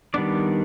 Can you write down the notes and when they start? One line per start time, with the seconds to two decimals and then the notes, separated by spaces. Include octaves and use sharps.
0.14 D#3 G3 B3 D4 D5